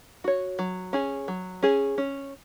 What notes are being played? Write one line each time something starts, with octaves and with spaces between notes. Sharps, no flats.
F#4 C#5
F#3
C#4 G#4
F#3
C#4 G#4
C#4